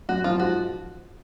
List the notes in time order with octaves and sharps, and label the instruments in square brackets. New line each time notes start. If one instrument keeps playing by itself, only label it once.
[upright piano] F#2 [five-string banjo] F#4
[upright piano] F3 [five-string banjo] F4
[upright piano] G#2 [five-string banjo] F#4